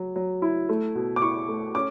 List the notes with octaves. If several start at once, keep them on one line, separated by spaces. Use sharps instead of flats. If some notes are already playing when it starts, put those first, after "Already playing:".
Already playing: F#3
F#3
E4
A3
B2
D6
E4 C#6
A3
C#4 D6